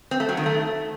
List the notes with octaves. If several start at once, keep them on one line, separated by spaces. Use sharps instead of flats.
C4
A3
F#3
D#3
A3